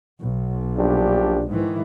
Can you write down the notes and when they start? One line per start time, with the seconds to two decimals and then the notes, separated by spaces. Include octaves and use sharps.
0.22 B1
0.78 A#1 D4 G4
1.48 G#2 D#3 E3